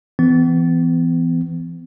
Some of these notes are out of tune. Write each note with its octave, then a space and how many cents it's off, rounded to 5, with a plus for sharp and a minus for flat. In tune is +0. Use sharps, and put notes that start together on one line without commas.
E3 +20 B3 +40